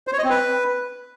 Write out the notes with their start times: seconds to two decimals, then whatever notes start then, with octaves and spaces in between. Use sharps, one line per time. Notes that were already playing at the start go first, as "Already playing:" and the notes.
0.07 C5
0.13 C#5
0.19 D#5
0.24 C4
0.30 B4